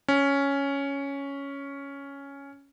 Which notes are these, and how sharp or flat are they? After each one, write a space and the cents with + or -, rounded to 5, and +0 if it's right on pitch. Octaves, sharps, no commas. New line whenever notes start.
C#4 +5